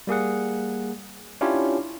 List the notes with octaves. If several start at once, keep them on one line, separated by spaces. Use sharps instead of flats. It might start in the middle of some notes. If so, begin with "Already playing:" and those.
G3 A#3 G#4 F#5
C#4 D4 E4 F4 G4 C#5